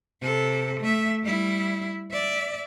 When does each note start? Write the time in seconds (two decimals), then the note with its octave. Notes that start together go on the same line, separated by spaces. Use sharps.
0.21 C3 A4
0.80 A3 E5
1.23 G3 E4
2.11 D5 E5